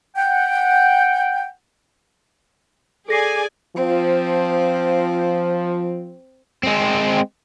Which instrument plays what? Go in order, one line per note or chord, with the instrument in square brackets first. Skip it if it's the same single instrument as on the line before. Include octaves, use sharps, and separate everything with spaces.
[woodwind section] F#5 G5
[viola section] G#4 D5 G#5 [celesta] A4 A#6 C7
[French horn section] F3 [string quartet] C4
[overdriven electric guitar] G#3 C4